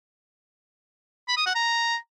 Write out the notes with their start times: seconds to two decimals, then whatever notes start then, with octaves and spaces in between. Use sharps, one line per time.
1.28 B5
1.37 D#6
1.46 F#5
1.55 A#5